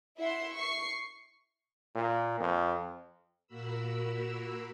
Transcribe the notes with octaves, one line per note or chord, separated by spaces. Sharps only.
E4 E5 F#5 C6
C#6 C7
A#2
F2
A#2 A#3 F#4 A#4 B5 E6